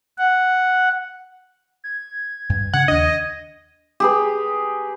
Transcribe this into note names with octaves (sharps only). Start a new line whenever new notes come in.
F#5
G#6
G2
C#3 F#5
D#2 D4 D#5
G4 G#4 B4